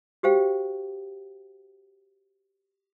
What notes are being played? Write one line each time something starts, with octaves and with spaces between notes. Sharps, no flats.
F#4 G4 C5 F5 G5